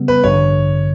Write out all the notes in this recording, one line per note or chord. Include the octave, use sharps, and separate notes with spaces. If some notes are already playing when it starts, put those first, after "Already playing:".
Already playing: C#3 G3 B3
B4
A1 G2 D3 C#5